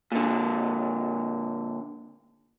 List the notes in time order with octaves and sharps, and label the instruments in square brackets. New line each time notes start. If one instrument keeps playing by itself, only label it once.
[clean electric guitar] A#2 D3